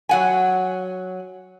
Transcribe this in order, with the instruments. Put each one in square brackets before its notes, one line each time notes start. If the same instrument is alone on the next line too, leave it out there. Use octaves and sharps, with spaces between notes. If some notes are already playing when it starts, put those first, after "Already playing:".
[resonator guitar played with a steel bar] F#3 F#5 G#5